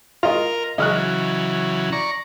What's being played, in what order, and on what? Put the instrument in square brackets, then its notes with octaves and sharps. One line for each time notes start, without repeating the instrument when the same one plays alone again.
[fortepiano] F4 D#5 [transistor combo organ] A#4 F6
[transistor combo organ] C#3 E3 F#3 [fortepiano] D#5 F6 F#6
[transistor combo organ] D5 A#5 C#6